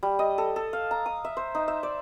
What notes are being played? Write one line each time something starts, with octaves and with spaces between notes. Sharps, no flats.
G3
D#5
A4
A4
F5
A#5
D#6
E5
C5
D#4
E5
D5